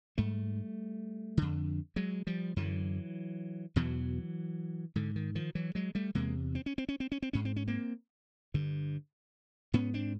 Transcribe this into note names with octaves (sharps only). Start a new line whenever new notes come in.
G#2 G3 A3
F2 D3
F#3 G#3
F3 G3
F#2 D3 E3 F#3
E2 B2 E3 F#3
G#2 D3
D#3
D#3 F3
E3 F#3
F#3 G#3
G3 A3
E2 C3 G#3 A#3
C4
C#4
C4
C#4
C4
C#4
C4
G#2 C#4
C4
C#4
A#3 C4
G2 D3
G#2 B3 C#4
C4 D4